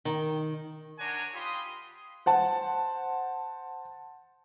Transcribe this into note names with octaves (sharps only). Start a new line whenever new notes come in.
D#3
D4 A#4 C#5 F#5 G#5 A#5
F4 G4 B5 C6 D#6
C5 F#5 A5